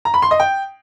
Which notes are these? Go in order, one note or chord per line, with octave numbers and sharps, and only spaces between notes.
A#5
B5
C6
D#5
G5